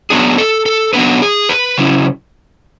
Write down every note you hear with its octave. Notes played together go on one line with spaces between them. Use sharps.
F#3 B3 D4 G#4
A4
A4
F#3 B3 D4 B4
G#4
B4
C#3 F#3 C#4 E4